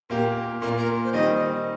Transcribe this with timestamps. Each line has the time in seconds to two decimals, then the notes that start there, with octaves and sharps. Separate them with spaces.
0.10 A#2 A#3 G4 A#4
0.61 A#2 A#3 F4 A#4
0.77 A#4
1.04 C5
1.13 D#3 G3 C4 D#4 D#5